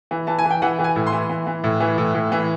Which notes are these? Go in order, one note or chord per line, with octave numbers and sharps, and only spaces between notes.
E3
E3 A5
G#5
E3
G5
E3 F#5
E3
G#5
A2
C6
E3
E3
E3
A2
E3
A2
A2
E3